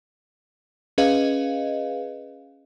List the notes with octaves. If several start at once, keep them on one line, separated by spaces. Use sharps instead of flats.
C#4 G#4 B4 D#5 F5